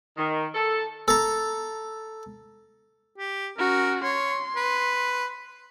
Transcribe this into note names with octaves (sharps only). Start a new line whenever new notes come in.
D#3
A4
A4 A#5
G4
C#4 F#4 A#4
C#5 C6
B4